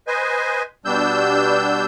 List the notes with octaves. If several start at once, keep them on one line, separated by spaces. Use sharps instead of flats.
B4 C5 D#5 G#5
B2 G3 D4 E6 G6